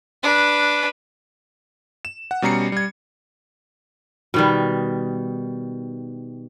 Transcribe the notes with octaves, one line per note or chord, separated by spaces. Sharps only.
D4 B4
E7
F#5
B2 G3 C#4 A#5 C7 C#7
G3 G#6
B2 D#3 G3